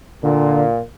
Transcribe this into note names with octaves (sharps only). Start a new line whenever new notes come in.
A#2 D3